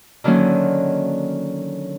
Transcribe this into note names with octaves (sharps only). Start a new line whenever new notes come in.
D3 D#3 F#3 A#3 C#4